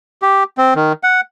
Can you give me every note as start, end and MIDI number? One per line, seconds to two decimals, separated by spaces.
0.22 0.44 67
0.58 0.74 60
0.75 0.93 51
1.03 1.21 78